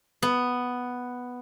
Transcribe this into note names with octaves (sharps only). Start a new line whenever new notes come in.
B3